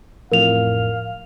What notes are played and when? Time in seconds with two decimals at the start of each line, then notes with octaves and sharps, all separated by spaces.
0.32 A1 F2 A2 A#4 F5 F7